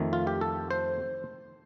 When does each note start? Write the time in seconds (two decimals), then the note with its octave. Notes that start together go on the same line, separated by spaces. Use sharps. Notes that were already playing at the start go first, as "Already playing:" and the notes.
Already playing: F2 D#3 A3
0.13 F4
0.27 G4
0.41 A4
0.71 C5